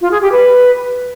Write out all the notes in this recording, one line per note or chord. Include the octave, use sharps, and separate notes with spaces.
F4
G#4
G4
B4